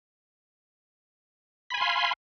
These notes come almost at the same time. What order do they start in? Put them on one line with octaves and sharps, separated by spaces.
B5 G#5 C6 F5